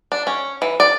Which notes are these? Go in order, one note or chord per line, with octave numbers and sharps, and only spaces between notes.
D4
C#4
E3
D5